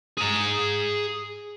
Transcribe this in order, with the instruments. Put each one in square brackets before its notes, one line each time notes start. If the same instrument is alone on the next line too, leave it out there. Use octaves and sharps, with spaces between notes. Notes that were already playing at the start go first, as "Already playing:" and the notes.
[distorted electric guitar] G#4 A#5